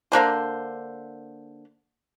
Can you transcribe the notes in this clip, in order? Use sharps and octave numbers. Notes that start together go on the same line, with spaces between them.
D3 A#3 D4 C5